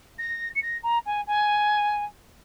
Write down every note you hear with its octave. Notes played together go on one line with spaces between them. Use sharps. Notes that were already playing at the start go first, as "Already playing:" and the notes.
A#6
C#7
A#6
A#5
G#5
G#5